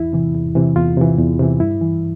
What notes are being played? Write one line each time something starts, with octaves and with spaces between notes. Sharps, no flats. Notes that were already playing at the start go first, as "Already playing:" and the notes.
Already playing: E2 E4
C3 E3
E2
C3 E3
E2 F4
C3 E3
E2
C3 E3
G2 E4
E3